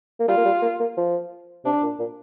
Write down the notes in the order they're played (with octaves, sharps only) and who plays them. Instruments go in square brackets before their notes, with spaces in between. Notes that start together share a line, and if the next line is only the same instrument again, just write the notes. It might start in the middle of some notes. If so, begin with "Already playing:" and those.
[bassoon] A#3
[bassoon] G3 [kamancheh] F4
[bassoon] A#3
G3
A#3
A#3
F3
[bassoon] C3 [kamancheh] D4
[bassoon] A#2
A#2